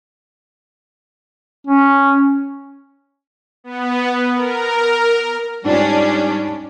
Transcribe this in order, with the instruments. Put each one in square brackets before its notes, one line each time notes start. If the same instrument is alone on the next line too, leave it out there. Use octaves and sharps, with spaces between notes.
[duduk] C#4
[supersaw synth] B3
A#4
[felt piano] G#2 F4 [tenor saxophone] G3 [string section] C#4 D4